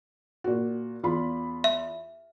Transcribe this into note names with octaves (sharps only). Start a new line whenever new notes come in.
A#2 F#4
E2 F4 B5
E5